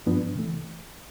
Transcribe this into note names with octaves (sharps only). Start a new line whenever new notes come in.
G2 F3 B3 D4
C3 E3 A3